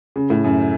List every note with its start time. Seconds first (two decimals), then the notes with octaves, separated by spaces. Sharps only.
0.16 C#3
0.30 A2
0.44 F#2